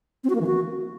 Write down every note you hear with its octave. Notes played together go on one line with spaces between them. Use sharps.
C4
F#4
A#3
E3
F#4